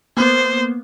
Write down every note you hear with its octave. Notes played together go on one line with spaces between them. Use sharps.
A#3 B3 C5